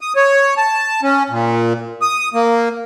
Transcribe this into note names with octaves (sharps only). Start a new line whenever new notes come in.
D#6
C#5
A5
C#4
A#2
D#6
A#3